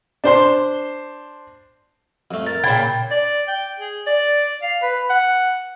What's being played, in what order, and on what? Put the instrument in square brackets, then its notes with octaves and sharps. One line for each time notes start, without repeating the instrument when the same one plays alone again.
[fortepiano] D4 C5 C6
[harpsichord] F2 A3
[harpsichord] A#4 [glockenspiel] A6
[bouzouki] A#2 G5 [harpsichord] C#3 [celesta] B5 G#6
[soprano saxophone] D5
G5
G#4
D5
F5
B4
F#5